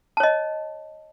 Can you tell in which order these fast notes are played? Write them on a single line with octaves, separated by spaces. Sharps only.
A5 C#5 D#5